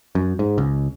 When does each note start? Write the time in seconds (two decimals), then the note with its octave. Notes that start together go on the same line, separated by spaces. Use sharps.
0.15 F#2
0.39 G#2
0.58 C#2